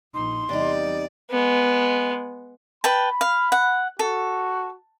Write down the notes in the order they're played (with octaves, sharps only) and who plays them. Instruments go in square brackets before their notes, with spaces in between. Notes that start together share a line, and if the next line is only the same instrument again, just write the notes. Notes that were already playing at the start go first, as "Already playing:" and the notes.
[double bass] A#1 D#4 [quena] C6
[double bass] E2 G3 [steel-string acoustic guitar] C3 D#4 [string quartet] D5
[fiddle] G#3 B3
[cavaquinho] B4 G5 A5 [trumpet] B5
[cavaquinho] F5
F#5
[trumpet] F#4 [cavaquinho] A4